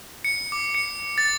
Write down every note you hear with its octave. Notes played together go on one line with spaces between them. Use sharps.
C#7
D6
C#7
A6